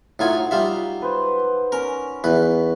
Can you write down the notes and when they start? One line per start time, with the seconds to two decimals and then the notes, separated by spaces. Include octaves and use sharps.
0.19 A2 F#3 D#4 F4 F#5 G#5
0.51 G3 F4 E5
1.02 B4 C5
1.72 C#4 A#4
2.24 E2 B4